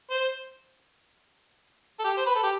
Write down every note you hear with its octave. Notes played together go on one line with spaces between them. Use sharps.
C5
A4
G4
C5
B4
A4
G4